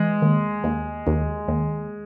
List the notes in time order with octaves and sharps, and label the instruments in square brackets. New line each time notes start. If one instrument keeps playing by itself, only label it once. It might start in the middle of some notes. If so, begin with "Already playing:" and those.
Already playing: [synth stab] E3 [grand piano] G#3
[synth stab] D#2
D#2
D#2
D#2